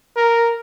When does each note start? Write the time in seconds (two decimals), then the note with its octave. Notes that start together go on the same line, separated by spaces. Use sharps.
0.17 A#4